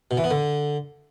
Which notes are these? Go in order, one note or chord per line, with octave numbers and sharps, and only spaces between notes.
B2
E3
B3
D3